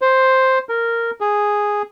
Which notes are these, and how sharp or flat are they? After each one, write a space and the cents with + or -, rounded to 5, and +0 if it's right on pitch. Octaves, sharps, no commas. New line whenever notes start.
C5 +5
A#4 -10
G#4 -5